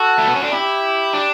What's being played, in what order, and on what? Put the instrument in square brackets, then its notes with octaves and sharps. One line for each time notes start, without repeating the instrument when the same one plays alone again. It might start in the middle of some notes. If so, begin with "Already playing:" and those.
Already playing: [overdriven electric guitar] F#4 [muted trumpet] A4
[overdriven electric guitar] A3
B3
C#4
D4
[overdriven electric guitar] E4 [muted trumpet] G4
[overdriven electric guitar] D4